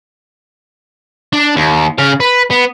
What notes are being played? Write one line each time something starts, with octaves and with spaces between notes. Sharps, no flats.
D4
D#2
C#3 F5
B4
B3